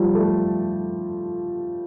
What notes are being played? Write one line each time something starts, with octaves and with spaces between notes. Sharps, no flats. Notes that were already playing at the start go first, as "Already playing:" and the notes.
Already playing: F3 G3
A3